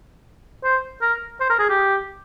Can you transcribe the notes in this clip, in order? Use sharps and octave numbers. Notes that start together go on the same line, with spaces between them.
C5
A#4
C5
A#4
G#4
G4